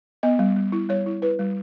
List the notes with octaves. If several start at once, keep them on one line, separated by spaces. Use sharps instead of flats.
B3 D#5
G3
G3
E4
G3 C#5
E4
E4 B4
G3